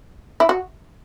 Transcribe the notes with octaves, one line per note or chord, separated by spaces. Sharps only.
E4
F#4